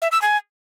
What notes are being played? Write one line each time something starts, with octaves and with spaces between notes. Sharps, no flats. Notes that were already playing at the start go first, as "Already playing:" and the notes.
E5
E6
G#5